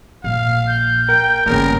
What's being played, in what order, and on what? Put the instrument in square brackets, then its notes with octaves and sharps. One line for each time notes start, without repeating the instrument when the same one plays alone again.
[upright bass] A#1 [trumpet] F5
[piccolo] G6
[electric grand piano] A#4 [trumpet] G5
[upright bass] G1 A#3 [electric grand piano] E2 C#3 [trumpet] A#4